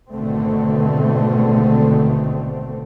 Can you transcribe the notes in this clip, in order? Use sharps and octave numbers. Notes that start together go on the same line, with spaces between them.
G#1 B2 D3 A3 C4